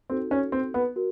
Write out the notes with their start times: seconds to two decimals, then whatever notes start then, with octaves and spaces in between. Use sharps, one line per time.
0.10 C4 D#4 F#4 A4
0.31 C#4
0.52 C4
0.74 B3
0.96 F#4 A#4